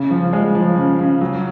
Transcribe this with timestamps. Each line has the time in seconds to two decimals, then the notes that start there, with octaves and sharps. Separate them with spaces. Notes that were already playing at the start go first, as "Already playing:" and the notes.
Already playing: C#3
0.11 F3
0.33 G#3
0.55 F3
0.78 C#3
0.99 C#3
1.21 F#3